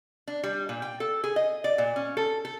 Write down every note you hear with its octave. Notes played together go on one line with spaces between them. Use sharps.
D4
G3
A#2
G5
A4
G#4
D#5
D5
A#2
C#4
A4
A4